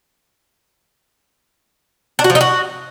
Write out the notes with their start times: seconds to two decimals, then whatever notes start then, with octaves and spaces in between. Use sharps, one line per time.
2.19 D4
2.24 F#4
2.30 F3
2.35 D#4
2.41 F#4